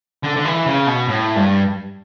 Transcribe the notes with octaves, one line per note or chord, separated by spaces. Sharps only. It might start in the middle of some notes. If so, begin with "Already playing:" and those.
D3
D3
E3
C#3
B2
A2
G2